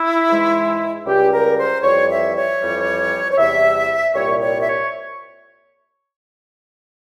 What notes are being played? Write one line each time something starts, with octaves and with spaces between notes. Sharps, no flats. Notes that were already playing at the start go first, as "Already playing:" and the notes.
Already playing: E4
G#2 E3 G#3
C#2 C#3 G3 G4
A#4
C5
F2 E3 G3 C#5
E5
C#5
F2 E3 G3
C#5
E2 C3 E3 G3 E5
C2 A#2 G3 C#5
C#5
E5
C#5